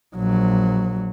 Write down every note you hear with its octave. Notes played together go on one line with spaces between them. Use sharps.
A#1 F#3